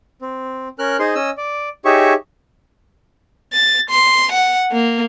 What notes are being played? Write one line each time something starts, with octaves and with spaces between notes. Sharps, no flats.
C4
C#4 A#4 F6 F#6
D#4 G#4 C5 C6
C#4 D#5 E6
D5
D#4 G4 G#4 C#5 E5 C#6
A6
C6
F#5
A#3